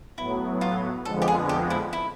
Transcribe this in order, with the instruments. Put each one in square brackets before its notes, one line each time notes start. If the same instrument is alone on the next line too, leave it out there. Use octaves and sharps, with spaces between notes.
[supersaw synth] A2 F#3 B3 [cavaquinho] E4
[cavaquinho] F4
[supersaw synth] F2 D3 F3 G#3 B3 [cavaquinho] A4
[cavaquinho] G4
G#4
G4
E4
E4